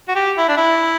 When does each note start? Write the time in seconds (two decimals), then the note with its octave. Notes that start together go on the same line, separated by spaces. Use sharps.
0.08 F#4
0.15 G4
0.38 E4
0.49 D4
0.57 E4